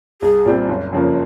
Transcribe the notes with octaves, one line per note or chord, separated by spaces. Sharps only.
C2 G#4
A#2 G3 C4
F#1
F2 C#3 F3 A#3